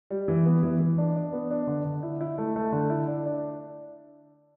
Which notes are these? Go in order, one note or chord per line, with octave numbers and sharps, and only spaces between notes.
G3
E3
B3
E3
E3
D4
D4
B3
D4
D3
D3
E4
E4
A3
A3
D3
E4
D4
D4